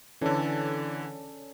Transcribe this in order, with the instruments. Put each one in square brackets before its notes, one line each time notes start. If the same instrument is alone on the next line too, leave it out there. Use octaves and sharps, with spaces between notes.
[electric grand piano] D3 E3 [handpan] C#4 A4 D5